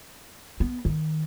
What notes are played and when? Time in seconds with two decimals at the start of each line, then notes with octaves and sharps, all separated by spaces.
0.60 B3
0.85 D#3